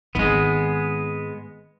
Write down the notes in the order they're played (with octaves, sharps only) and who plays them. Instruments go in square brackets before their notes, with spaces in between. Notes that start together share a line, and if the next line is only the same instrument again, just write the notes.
[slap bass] G#1 D#3 [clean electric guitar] G#3 B3